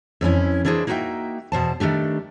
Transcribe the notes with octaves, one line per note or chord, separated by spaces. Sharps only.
F2 E3 C#4 E4
E3 A#3 D4 E4 G#4 C5
A#3 D#4 F#4 D5 E5 G5
E2 B2 C5 A5
D#3 A3 D4 G4